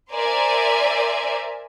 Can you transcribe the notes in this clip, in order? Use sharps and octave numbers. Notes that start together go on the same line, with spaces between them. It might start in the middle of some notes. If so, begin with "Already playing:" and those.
A#4 C5 D5 E5 G#5